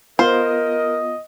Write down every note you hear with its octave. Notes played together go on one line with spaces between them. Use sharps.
B3 F4 A#4 C5 D#5